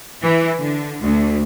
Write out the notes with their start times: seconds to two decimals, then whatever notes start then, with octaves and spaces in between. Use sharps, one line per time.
0.22 E3
0.59 D3
1.02 D2